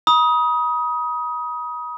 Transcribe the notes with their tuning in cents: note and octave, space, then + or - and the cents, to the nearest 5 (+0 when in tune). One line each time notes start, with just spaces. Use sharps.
B5 -40 D#6 +15